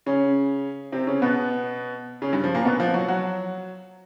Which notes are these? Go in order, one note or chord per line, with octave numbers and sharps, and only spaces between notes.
C#3 C#4
C3 C4
C#3 C#4
B2 B3
C#3 C#4
G2 G3
F3
A#2 A#3
B2 B3
F3 F4
F#3 F#4
F#3 F#4